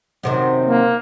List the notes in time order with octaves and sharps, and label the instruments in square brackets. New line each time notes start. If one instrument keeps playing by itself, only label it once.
[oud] F#2 C3 D#3
[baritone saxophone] A#3